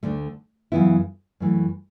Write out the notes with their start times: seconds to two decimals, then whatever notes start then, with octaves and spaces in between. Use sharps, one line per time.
0.03 D2 D3 A3
0.72 F#2 C#3 E3 B3 E4
1.40 F#2 E3 A3